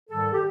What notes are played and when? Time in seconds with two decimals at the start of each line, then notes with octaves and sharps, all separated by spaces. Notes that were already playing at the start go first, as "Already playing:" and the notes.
0.10 G#2 D#3 G3 A4
0.32 G4